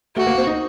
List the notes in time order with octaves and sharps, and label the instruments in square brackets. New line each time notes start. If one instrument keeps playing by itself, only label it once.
[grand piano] A3 [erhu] F#4
[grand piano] A#3
C4
D#4